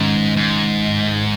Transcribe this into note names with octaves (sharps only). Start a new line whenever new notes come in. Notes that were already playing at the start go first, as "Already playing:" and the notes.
Already playing: G#2 D#3 G#3 C#4
G#2